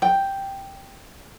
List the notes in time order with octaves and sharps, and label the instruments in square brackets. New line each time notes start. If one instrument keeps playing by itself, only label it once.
[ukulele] G5